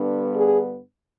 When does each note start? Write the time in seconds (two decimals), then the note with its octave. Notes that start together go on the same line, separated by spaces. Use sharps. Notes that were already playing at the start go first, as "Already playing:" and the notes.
Already playing: G2 D3 G3 B3
0.35 G#4